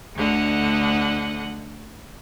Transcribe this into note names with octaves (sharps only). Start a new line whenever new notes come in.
D2 D3 D#5 F#5